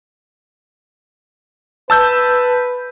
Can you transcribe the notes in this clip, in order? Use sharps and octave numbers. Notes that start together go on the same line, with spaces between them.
B4 A5 E6 G6